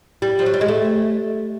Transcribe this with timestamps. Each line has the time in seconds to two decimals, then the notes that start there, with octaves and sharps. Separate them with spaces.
0.22 G3
0.39 F3
0.46 F#3
0.54 G3
0.61 G#3
0.68 A3